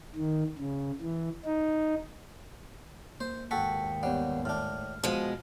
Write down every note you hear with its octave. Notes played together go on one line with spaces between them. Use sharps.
D#3
C#3
E3
D#4
A#3 C5
D#2 G#2 F#4 A4 G5 B6 C#7
G3 B3 C#5 F#5
A2 D4 F6
B2 F3 G#3